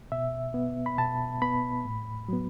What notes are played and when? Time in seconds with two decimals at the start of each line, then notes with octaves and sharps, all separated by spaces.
0.12 B2 E5
0.54 B3
0.86 B5
0.98 B2 A5
1.42 B3 B5
1.85 A2
2.29 F#3 B3